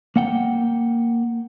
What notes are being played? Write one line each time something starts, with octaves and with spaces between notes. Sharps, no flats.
A#3 F#5 G5